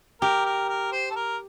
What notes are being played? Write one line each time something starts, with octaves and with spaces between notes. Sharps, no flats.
G4 A#4
A#4
A#4
C5
A4
A#4